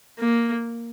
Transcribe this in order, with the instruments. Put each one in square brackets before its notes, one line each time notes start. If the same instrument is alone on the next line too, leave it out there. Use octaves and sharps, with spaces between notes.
[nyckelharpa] A#3